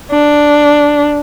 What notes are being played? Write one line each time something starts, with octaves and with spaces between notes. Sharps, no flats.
D4